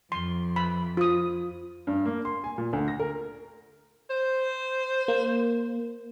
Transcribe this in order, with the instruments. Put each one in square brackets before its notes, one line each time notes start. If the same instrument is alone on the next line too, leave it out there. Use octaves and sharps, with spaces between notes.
[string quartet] F2 [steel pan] C6
[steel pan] B5
F4 D#6
[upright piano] G2
A#3
C6
G#5
A#2
D2
A#6
A#4
[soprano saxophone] C5
[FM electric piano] A#3